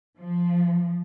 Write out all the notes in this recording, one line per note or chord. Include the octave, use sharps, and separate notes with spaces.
F3